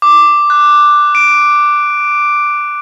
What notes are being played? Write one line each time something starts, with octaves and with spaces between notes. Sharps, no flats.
D6
F#6
D7